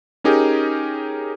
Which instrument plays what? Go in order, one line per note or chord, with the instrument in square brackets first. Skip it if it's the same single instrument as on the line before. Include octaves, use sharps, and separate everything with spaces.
[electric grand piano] C#4 D#4 G4 G#4 A#4